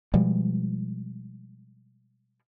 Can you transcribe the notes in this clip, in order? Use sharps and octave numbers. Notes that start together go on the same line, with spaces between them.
B2 F3 G3 G#3